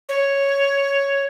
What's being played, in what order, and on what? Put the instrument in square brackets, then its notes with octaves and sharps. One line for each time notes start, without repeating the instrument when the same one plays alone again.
[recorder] C#5